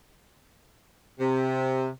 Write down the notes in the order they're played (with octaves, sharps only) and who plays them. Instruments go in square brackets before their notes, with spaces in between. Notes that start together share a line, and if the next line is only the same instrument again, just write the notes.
[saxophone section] C3